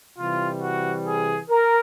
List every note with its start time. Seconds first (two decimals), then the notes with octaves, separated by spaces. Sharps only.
0.17 C3 E3 G3 F4
0.61 F#4
1.06 G#4
1.50 A#4